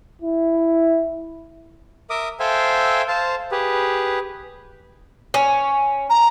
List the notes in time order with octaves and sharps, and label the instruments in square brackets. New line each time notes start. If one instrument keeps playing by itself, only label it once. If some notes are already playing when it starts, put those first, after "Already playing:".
[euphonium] E4
[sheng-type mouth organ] A#4 E5 D6 D#6
A4 C5 E5 F5 G5 G#5
C5 F5 A5
G4 G#4 B4
[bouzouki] C#4
[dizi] A#5